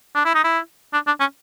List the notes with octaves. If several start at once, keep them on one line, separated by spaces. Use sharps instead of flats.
D4
E4
D#4
E4
D4
D4
C#4